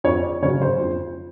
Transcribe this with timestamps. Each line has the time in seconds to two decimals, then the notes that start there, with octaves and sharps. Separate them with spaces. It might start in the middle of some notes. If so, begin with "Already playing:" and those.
0.04 F2 C#5
0.23 D5
0.42 C#3 C#5
0.46 F#3
0.62 C5
0.81 F2